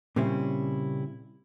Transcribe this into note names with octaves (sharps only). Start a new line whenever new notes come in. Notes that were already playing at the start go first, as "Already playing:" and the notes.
A#2 C#3 G3 C4 C#4 E4